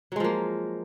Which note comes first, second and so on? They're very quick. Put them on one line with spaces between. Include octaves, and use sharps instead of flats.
F#3 G#3 F3 A#3